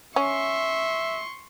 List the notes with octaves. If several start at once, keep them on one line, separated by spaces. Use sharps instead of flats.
C#4 E5 C6 C#6